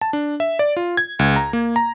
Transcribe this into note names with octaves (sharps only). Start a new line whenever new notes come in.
A5
D4
E5
D5
F4
G#6
C#2
A#5
A#3
A#5